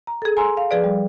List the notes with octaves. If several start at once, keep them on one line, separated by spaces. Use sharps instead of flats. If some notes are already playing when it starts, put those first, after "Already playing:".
A#5
G#4 A4
G#5 A#5 C6 E6
F5
F3 G#4 B4 D5
G3